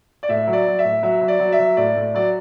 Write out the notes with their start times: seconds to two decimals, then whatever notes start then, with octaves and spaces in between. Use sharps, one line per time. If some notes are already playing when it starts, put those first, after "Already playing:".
0.23 D5
0.29 A2 E5
0.47 F#3
0.53 D5
0.66 F#3
0.79 E5
0.84 A2
1.03 F#3 E5
1.21 F#3
1.28 D5
1.39 F#3
1.52 E5
1.58 F#3
1.77 A2 D5
1.95 A2
2.01 D5
2.15 F#3 D5